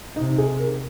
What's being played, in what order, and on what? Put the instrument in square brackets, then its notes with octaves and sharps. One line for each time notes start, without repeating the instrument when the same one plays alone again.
[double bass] C3 [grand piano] D#4
[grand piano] G#4
A#4